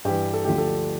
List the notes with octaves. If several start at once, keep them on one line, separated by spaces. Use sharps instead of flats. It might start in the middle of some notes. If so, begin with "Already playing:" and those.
G2 E3 G4
A4
D2 D3 F3 G4
A4